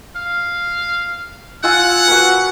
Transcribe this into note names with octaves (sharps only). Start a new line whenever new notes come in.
F5
F4 F#5 G#5 E6
F#4 A#4 B4